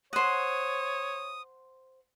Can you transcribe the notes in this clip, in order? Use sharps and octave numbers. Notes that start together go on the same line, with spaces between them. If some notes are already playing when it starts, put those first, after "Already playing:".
C5 C#5 F#5 D#6